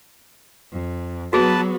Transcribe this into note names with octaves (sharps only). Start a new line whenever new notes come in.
F2
F#3 B3 F#4 G#4 B4 A5